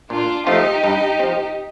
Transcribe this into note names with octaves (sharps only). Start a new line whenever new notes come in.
A#2 D4 F4
F3 A3 C4 D#4 F4 G4
G2
F3 C4